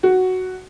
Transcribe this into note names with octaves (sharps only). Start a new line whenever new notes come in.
F#4